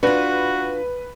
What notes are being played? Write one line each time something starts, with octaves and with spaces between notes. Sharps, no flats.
D4 F4 F#4 B4